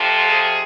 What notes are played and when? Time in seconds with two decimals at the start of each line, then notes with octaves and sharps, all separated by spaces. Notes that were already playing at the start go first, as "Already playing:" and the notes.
Already playing: F2 C3 F3
0.25 G#4